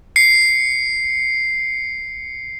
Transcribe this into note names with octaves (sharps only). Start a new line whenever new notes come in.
C7 C#7